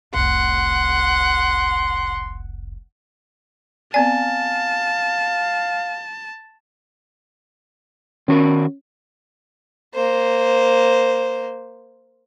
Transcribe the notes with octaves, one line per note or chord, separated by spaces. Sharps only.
F1 C2 F#5 C6
B3 C4 D5 F5 G#5 A5
D#3 C#4 F#4 A#4
A#3 C5